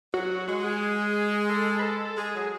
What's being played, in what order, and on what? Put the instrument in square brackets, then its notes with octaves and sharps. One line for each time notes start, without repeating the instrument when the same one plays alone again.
[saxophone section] F#3 [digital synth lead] F#4
[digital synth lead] F#4
[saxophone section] G#3 [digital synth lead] F#4
[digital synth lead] G#4
A4
B4
A4
[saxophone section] G#3 [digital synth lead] G#4
[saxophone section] F#3